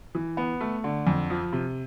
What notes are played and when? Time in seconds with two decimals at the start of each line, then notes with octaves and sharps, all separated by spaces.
0.15 E3
0.37 B3
0.60 A3
0.84 D3
1.07 F2
1.30 F3
1.53 C3